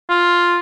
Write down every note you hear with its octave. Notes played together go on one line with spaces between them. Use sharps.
F4